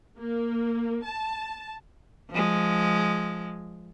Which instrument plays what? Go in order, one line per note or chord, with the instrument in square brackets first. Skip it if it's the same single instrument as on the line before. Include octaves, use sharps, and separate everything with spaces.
[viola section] A#3
A5
[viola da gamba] F3 G#3